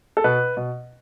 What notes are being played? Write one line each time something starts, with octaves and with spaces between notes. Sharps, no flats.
A4
B2 B4
B2